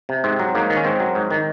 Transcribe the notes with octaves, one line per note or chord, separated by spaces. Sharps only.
C3
G#2 C4
F#3
G#2 A#3
D#3
C#4
G#2 C4
F#3
G#2
D#3